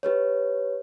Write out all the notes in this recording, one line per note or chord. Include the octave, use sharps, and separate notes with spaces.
G4 B4 C#5